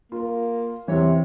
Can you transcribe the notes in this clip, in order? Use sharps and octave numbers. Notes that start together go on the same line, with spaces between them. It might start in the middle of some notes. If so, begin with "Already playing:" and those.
A#3 F4 A#4
E2 C3 E3 C#5